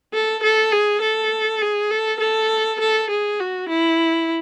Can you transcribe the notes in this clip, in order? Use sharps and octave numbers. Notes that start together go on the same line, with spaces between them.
A4
A4
G#4
A4
G#4
A4
A4
A4
G#4
F#4
E4